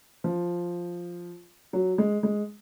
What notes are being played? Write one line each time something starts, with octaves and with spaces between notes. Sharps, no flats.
F3
F#3
G#3
G#3